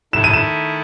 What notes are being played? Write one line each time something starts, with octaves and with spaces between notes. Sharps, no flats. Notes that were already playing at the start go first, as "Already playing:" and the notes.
D#3 A3 E4 E7
D#7
E7